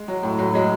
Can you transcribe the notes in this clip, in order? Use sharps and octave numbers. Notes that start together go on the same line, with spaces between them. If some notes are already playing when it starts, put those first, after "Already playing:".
Already playing: G#3
F#3
A2
A2 F#3
F#3 G#3